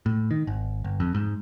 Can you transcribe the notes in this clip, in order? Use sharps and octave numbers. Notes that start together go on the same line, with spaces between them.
A2
D#3
G#1
G1
F2
G#2